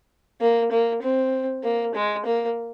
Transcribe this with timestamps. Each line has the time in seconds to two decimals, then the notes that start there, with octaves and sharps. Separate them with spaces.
0.41 A#3
0.71 A#3
1.02 C4
1.63 A#3
1.94 G#3
2.25 A#3